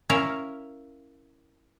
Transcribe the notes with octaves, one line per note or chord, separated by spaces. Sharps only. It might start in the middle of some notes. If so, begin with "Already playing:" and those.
C#4 E4 A#4 F5